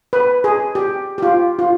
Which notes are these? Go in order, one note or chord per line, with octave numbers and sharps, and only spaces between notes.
B4
G#4
G4
G4
F4
F4